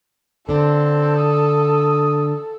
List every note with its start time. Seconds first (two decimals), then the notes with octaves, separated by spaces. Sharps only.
0.49 D3 C4 D4 A4
1.16 D#6